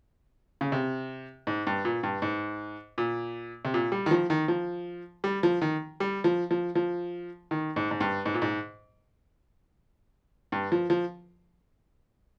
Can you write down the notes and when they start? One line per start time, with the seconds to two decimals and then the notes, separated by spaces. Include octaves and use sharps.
0.61 C#3
0.72 C3
1.47 G#2
1.67 G2
1.85 A#2
2.03 G2
2.22 G#2
2.98 A#2
3.65 C3
3.74 A#2
3.92 G3
4.06 D#3
4.11 F3
4.30 D#3
4.48 F3
5.24 G3
5.43 F3
5.62 D#3
6.00 G3
6.24 F3
6.51 F3
6.75 F3
7.51 D#3
7.76 G#2
7.91 G#2
8.01 G2
8.26 G#2
8.34 A#2
8.42 G#2
10.52 G2
10.72 F3
10.90 F3